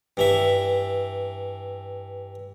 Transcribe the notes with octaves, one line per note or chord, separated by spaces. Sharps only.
G2 E3 E5